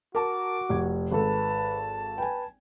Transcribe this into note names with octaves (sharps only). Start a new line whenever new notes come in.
F#4 A#4 A5 D6
F1 G#6
G#1 A4 B4 A5
B4 G5 G#5